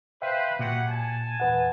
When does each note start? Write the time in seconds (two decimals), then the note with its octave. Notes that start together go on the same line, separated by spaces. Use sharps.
0.22 B4 C5 E5 F5 G5
0.59 A#2 F#3 G4 F#5
0.88 G#5 A5
1.40 E2 B4 F#5